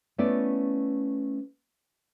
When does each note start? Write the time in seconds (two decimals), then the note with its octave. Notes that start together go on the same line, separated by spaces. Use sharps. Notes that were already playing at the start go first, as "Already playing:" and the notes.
0.18 A3 B3 C#4 E4 D5